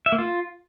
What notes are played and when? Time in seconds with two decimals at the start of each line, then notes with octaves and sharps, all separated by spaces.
0.06 E5
0.12 A#3
0.18 F4